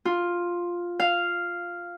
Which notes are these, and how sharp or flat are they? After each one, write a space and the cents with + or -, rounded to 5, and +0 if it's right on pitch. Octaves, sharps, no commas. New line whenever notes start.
F4 +5
F5 -5